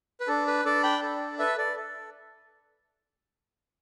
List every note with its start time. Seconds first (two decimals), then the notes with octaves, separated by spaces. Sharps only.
0.20 B4
0.27 D4 A4
0.47 B4
0.65 D4 A4 D5
0.83 G5 B5
1.02 A4
1.39 A4 B4 E5
1.58 A4 D5
1.76 A4